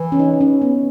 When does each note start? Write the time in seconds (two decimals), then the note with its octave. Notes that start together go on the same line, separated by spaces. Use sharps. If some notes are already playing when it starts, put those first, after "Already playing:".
Already playing: E3
0.12 C#4
0.19 D#4
0.41 C#4
0.62 B3